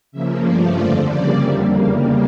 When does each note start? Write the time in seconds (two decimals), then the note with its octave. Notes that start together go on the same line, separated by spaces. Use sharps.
0.12 C#3 F3 A#3 E5
0.44 G2 F3 A3 D5
0.76 F2 D3 F3 D5
1.08 C#3 G3 A#3 D5
1.41 F2 D3 G3 A#3 E5
1.73 E2 C#3 G3 A#3 F5